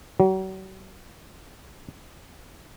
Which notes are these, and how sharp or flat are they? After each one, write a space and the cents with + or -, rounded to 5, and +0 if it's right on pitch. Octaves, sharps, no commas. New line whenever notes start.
F#3 +40